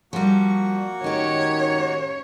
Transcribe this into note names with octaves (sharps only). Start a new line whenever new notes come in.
F3 G3 A#3 F#4 C#6
D#3 C#4 G4 C#5